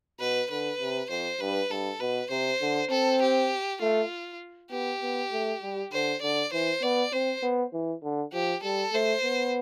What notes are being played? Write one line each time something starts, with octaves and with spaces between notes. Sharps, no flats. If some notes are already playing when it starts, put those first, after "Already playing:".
B2 B4
D3 B4
C3
F2 C5
G2 B4
G2 A4
B2 B4
C3 C5
D3
C4 A4
G4
A3 F4
B3 G4
B3
A3
G3
D3 C5
D3 D5
E3 C5
B3 D5
C4 C5
B3
E3
D3
F3 G4
G3 A4
A3 C5
B3